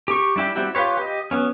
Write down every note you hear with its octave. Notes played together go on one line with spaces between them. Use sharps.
G4 C#6
G3 D4 E4 G4
G3 C4 E4 F#4 G4
F4 G4 B4 C#5
G4 D#5
F#3 B3 C#4